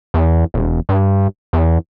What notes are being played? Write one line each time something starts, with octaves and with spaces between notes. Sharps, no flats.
E2
E1
G2
E2